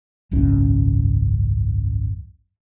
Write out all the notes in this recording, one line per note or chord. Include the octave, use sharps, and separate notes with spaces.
G#1 C#2 F#2 C#4